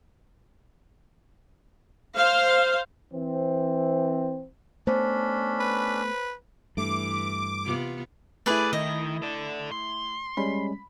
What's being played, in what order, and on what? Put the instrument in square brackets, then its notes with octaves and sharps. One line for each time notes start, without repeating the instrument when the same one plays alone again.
[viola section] C5 F5
[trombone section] E3 C4
[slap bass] A3 B3 [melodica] C#4 D4 B5 [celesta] C5
[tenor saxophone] B4
[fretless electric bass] G2 A3 [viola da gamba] E3 [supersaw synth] D6
[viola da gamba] C3 B3 F4
[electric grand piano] A3 E4 [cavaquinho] G#4 B4 D5
[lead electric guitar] D#3 [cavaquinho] D#5
[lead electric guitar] A4 D5
C6
[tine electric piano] G3 G#3 C#4 [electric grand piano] B5